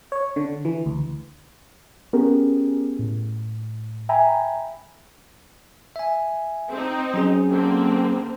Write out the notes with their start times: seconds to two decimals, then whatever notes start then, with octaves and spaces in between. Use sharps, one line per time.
0.12 C#5
0.36 D3
0.65 E3
0.86 D2
2.13 B3 C#4 G4 G#4 A#4
2.99 A2
4.09 E5 G5 G#5 A#5 B5
5.96 E5 G#5
6.71 C4 D#4
7.14 F#3 C#4 G#4
7.51 D3 A#3 C4